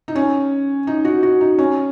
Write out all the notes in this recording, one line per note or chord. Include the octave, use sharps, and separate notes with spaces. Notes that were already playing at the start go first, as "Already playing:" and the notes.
D#4
C#4
D#4
F#4
F#4
D#4
C#4